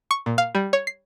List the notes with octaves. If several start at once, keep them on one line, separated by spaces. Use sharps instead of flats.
C#6
A#2
F5
G3
C#5
C7